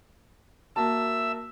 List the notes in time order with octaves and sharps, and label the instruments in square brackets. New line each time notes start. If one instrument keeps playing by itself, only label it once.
[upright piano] A#3 F#4 A5 [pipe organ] E5 E6